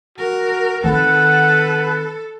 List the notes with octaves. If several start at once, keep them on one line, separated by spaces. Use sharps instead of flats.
F#4 A#4
D#3 C4 A4 B4 F#5